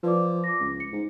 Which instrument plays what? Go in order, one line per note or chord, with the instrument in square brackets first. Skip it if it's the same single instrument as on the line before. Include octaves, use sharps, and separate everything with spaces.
[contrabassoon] F3 [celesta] B4 D5 D6
[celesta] D6 A#6
[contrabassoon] C#2
[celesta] C#7
[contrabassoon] G#2